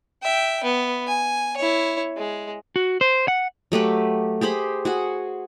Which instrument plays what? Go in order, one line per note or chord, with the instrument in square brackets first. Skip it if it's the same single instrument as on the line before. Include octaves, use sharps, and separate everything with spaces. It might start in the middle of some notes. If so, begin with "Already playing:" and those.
[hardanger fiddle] E5 G5
B3
G#5
E4 C#5
G#3
[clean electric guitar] F#4
C5
F#5
[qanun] F#3 A3 G4 B4
G4 G#4 C5 B5
F#4 G#4 F#5